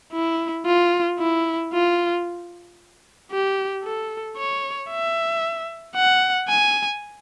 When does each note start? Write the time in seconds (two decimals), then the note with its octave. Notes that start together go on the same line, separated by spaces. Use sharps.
0.13 E4
0.66 F4
1.19 E4
1.73 F4
3.32 G4
3.83 A4
4.37 C#5
4.90 E5
5.96 F#5
6.48 G#5